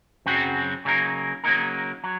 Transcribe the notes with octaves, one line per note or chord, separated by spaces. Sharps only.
F#2 C#3 F#3 C4 F#4
C#3 F#3 A#3 D#4 A#4
C#3 F#3 A#3 D#4 A#4
F#3